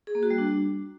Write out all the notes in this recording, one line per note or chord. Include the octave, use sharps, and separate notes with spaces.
G#4
A#3
F#4
G3
D4